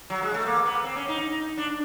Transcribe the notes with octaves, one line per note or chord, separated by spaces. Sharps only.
F#3
G#3
A3
A#3
B3
C4
C#4
D#4
D4